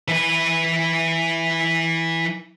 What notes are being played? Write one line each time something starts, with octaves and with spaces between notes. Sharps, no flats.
E3 B4